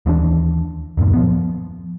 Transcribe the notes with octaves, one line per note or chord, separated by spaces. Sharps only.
D#2 E3 F#3 D4
D#1 F#2 A#2 D#3
F3 B3